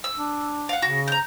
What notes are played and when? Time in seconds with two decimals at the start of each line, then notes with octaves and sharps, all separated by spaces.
0.04 E6
0.17 D4
0.69 F5 F#5
0.82 C#3 F#4
1.08 A#5 G6